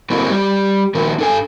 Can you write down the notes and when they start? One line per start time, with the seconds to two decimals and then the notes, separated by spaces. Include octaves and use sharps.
0.10 D3 A#3 C4 E4 F#4
0.30 G3 G4
0.95 D#3 F3 A#3 F#4
1.18 D4 A4 G#5